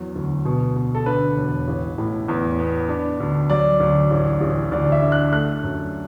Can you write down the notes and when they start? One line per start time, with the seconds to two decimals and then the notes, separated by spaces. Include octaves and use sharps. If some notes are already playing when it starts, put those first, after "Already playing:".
Already playing: E2 F#3
0.16 D2
0.45 B2
0.76 B2
0.95 A4
1.06 D3 B4
1.37 E1
1.67 A1
1.98 A2
2.28 E2
2.59 B3
2.89 D4
3.20 D2
3.50 F#3 D5
3.80 D2
4.10 A1
4.41 A1
4.71 D2 D5
4.92 E5
5.02 D3
5.12 F#6
5.32 A3 F#6
5.63 F#2